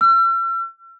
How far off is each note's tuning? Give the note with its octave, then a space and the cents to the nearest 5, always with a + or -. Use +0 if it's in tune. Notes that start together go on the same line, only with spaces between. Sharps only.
E6 +45